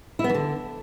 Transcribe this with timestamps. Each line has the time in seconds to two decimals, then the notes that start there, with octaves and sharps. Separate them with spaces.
0.19 E4
0.24 B3
0.29 E3
0.34 D3